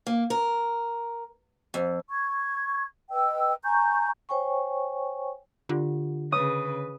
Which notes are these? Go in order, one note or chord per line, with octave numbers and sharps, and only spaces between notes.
A#3
A#4
F2
C#6 G#6
B4 D#5 G5 E6
G#5 A#5 C#6 G6
C5 C#5 G5 G#5 C#6
D3 F4 G4 F#5
C#3 B4 C#5 D#6